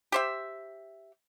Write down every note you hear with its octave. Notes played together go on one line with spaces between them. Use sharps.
G4 C5 E5